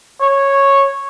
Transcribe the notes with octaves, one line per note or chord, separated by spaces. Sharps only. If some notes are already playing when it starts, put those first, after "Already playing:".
C#5